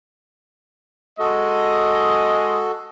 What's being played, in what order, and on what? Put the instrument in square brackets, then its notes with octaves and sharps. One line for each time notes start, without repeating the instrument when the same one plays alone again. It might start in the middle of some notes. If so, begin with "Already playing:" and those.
[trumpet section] G#3 D#5 [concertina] F#4 A4